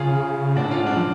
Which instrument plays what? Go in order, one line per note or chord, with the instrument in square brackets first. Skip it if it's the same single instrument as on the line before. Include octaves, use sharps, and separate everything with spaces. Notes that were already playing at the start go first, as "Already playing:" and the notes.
Already playing: [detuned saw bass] C#3 [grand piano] F4 G#4
[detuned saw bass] A2 [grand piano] D4 F#4
[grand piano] C#4 F4
[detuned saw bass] G#2
[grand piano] D4 F#4
[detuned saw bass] F3